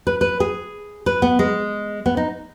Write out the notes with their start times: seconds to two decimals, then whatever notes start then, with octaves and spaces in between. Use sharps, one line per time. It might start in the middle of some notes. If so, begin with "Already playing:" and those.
0.07 B4
0.21 B4
0.40 G#4
1.06 B4
1.22 B3
1.39 G#3
2.06 B3
2.17 D#4